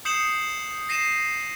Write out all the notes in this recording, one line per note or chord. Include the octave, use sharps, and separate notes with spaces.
D#6 G6 C7 C#7 E7 F#7
A#6 C7 D#7 E7